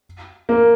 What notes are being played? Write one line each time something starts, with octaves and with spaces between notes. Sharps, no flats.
A#3